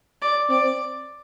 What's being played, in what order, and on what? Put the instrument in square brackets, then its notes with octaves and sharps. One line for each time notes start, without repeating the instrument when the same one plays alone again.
[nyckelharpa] D5
[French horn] C4 [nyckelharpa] D5